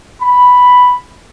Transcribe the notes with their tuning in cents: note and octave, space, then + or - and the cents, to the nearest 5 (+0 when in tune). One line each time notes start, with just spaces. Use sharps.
B5 +0